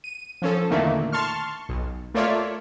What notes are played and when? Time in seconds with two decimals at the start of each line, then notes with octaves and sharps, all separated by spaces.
0.04 D#7
0.42 F3 C#4 A4
0.70 E2 A#2 D3 D#3 A3 A#3
1.12 A5 C6 C#6 F6
1.69 B1
2.14 A3 A#3 F4 C#5 D5 E5